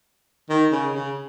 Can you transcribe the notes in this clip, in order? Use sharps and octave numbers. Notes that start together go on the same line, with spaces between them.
D#3
C#3
C#3